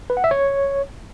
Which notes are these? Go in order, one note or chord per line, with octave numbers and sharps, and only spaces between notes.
B4
F#5
E5
C#5